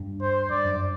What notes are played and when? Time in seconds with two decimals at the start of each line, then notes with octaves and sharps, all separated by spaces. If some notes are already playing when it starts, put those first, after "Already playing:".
Already playing: G2
0.22 C5
0.50 G2 D5
0.65 F#2